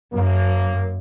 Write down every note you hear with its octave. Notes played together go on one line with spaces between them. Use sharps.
F#2 A#3